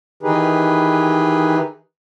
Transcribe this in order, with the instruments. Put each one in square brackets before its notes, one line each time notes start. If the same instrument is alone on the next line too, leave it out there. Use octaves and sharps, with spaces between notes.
[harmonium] D#3 E3 D#4 G4 G#4 B4